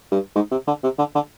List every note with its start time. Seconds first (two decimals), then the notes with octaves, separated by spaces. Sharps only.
0.11 G2
0.35 G#2
0.51 C3
0.67 D3
0.83 C3
0.98 D3
1.15 D3